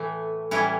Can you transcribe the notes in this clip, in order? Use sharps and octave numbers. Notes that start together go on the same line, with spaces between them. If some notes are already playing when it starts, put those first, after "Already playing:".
Already playing: A2 E3 A3
A2 E3 G3 C#4 E4